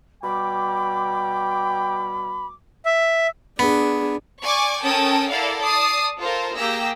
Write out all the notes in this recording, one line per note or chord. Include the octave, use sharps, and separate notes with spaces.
B2 G3 G5 B5 D6
E5
B3 D4 G#4
D5 G#5 C#6 D6
C#4 A4 A#4 G5 A5 D#6
E4 A4 A#4 D5 F5 F#5
D5 A5 D#6 C7
F4 A4 A#4 C5
A#3 G4 G#4 G5 E6 A#6